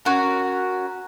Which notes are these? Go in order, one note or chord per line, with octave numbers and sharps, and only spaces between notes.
C#4 F#4 A#4